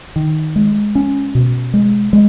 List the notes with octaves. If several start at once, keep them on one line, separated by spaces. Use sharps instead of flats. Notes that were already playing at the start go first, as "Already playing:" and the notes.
D#3
G#3
C#4
B2
G#3
G#3